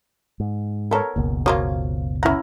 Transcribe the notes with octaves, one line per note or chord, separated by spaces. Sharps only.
G#2
B3 A4 A#4 C#5
F#1 C#2 B2 A#3
F3 A#3 F4 F#4 A#4 C#5
C#4 E4 F#5 A#5